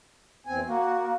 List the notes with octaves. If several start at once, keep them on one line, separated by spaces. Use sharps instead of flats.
E2 C4 G#5
A#3 F#4